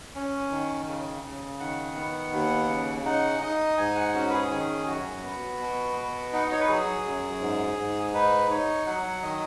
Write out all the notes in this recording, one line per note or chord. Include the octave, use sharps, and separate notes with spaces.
C#4
D#3
C#3
C#3
D#3 F#5
B3
D#2
C#3
D#4 F#5
D#4 D#5
G#2 G#5
F#5
C#4 F#4
B4
G#4
D#3 G#4
F#2 F#4
B3
B2
B3
D#4 F#5
D#5
C#5
B4
F#3 G#4
F#2
G#2
G#2
D#4 B4
D#4 C#5
F#3 F#5
D#3 D#5